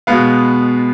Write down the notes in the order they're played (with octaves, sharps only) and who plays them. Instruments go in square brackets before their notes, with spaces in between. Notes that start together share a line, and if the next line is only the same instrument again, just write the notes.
[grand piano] B2 G#3 B3 F5